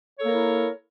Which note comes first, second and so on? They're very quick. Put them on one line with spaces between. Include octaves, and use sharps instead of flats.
C#5 A4 A#3 A#4 E4